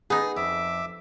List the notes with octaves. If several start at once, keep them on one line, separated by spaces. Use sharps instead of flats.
B3 D#4 G#4
F2 E5 D6 E6